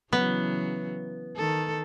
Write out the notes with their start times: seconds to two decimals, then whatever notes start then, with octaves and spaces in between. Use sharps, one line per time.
0.13 C#3 E3 F#3 B3
1.36 D#3 A4